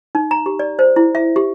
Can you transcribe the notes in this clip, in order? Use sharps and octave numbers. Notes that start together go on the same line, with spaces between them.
D#4
A#5
G4
D5
C5
E4
E5
G4